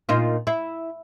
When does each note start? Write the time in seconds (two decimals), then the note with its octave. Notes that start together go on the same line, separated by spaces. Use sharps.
0.09 A#2 D#4 F4
0.47 E4